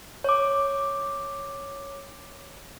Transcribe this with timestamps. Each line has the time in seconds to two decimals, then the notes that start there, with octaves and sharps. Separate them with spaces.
0.24 C#5 D6